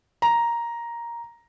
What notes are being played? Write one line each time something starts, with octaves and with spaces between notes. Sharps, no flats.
A#5